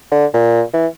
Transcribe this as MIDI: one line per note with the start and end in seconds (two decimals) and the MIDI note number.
0.12 0.26 50
0.34 0.63 46
0.74 0.87 52